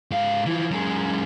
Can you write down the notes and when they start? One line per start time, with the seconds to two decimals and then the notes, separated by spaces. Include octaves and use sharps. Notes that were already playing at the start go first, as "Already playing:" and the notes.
0.11 G#2 F5
0.46 E3 F3
0.71 F#2 G#3